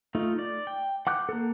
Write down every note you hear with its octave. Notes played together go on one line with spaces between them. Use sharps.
A3 D#4 F4
D5
G5
F#5 D6 F#6 G6
A#3 A4